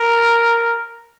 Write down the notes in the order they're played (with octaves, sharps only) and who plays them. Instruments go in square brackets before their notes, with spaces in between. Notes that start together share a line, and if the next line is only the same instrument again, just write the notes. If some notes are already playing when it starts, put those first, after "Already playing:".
Already playing: [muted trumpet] A#4